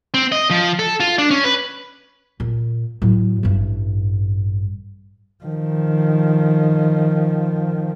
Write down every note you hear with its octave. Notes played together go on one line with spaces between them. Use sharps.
C4
D#5
F3
A4
F4
D4
C#4
B4
A#2
A2 F#3
A1 G2
D#3 F3